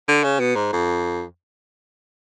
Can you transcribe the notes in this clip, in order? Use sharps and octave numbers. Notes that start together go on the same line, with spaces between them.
D3
C#3
B2
G#2
F2